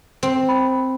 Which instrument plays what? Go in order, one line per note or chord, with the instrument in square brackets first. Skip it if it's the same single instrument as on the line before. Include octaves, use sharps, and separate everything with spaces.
[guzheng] C4
[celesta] B5